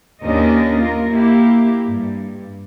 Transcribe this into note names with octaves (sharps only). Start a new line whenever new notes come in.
D#2 C#4 D4 A#4 D#5
A#3 F4 A#4
A#3 E4 G4
G2